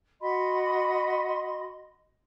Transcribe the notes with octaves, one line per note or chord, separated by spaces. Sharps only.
F#4 D#5 B5 C6